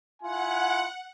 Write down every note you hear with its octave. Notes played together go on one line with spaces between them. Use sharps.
E4 F4 F#5 G#5